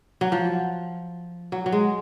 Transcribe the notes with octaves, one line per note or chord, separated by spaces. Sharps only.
F#3
F3
F#3
F#3
G#3